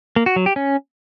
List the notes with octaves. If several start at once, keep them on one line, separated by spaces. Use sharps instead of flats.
A#3
F#4
F#3
G4
C#4